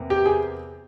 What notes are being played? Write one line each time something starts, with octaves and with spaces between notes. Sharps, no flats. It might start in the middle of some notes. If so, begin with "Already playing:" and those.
Already playing: E2 C3 A#3
G4
G#4